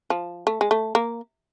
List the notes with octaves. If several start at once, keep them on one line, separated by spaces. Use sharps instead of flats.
F3
A3
G#3
A3
A#3